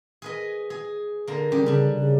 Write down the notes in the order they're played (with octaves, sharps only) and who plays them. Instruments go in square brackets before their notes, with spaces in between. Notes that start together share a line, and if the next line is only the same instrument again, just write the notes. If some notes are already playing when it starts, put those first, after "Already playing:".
[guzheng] G#4 B4 D#5
G#4
D3 A#3
[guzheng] G3 G4 G#4 [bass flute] C#4
[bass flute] C#3 [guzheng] G3 D4
[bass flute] C#3